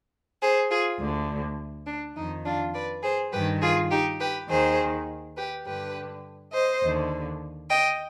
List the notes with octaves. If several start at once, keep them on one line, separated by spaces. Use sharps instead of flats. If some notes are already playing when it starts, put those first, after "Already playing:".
G#4 C5
F4 G#4
D2 D3
D4
F2 D#3 D#4
D4 F4
B4 D5
G#4 C5
G2 D#3 G4 B4
F4 G#4
D#4 G4
G4 B4
D#2 D#3 G#4 C5
G4 B4
G2 D3 G4 B4
C5 D#5
D#2 D3
D#5 G5